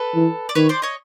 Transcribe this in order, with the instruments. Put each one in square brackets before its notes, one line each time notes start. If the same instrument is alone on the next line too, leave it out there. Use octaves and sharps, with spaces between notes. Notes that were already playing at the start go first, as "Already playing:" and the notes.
Already playing: [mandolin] A4 B4
[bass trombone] E3
[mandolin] D5
[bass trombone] D#3 [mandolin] B4 C#5
[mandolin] C5 D5
C#5 D#5